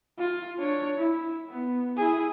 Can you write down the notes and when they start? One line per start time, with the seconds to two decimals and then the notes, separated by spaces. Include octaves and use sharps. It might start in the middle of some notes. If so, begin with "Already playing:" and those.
0.18 F4
0.58 D4 C#5
0.98 E4
1.49 B3
1.97 E4 G#4